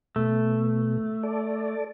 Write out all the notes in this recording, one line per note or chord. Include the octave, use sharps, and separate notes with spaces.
B2 A3
A4 D5